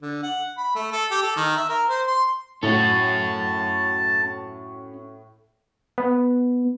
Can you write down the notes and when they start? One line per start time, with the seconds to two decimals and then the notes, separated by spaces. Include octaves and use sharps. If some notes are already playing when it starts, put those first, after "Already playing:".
0.02 D3
0.23 F#5
0.57 B5
0.75 A3
0.92 A4
1.11 G4
1.22 A4
1.36 D#3
1.56 E5
1.69 A#4
1.89 C5
2.07 C6
2.63 A2 C#4 F#4 A5
5.98 B3